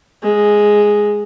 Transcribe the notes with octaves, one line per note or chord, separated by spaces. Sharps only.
G#3